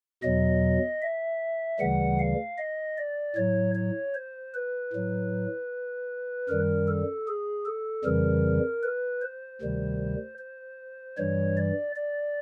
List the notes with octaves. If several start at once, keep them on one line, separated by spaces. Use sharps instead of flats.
E2 B2 F#3 D#5
E5
D2 C#3 E3 G3 F#5
F5
D#5
D5
A2 F#3 C#5
C#5
C5
B4
A2 F#3
F#2 D#3 G3 A#4
A4
G#4
A4
F2 C#3 E3 G3 A#4
B4
C5
D2 C3 D#3 G3
C5
G2 E3 G3 C#5
D5
D5